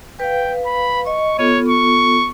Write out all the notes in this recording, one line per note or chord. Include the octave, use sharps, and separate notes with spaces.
B4 F5 G5
B5
D#5 C#6
B3 F4 A4 C#5
C#6